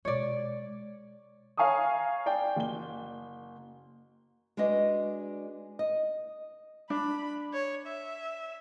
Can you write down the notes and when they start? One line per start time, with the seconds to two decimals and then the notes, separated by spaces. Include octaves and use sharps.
0.05 B2 G#3 C#5 D5
1.57 C#5 F5 G#5 A#5 C#6 D#6
2.26 D5 G5 G#5
2.56 F#1 G7
4.57 G#3 D4 F#4 B4 D#5
5.79 D#5
6.90 D4 B5
7.53 C#5
7.87 E5